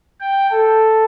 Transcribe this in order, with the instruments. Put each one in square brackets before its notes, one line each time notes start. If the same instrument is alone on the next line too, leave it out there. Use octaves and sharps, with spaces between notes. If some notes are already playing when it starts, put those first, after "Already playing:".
[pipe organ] G5
A4